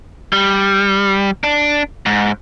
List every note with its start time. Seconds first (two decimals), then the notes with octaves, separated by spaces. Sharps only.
0.33 G3
1.44 D4
2.06 G#2